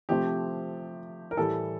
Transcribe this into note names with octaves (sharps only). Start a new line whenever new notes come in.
C3 F3 A3 C4 G4
A#4
A2 E3 G3 A4